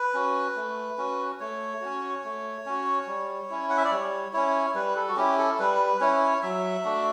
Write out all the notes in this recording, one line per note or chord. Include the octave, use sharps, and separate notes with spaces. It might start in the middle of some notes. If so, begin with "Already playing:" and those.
Already playing: B4
C#4 F#4
A3
C#4 F#4
A3 C#5
C#4 F#4
A3
C#4 F#4
G3
C#4 E4
F#5
E5
D5
G3 C#5
C#4 E4 C#5
G3 B4
A4
F#4
C#4 E4 G4
A4
G3 B4
C#4 E4 C#5
F#3 E5
A3 D4 F#4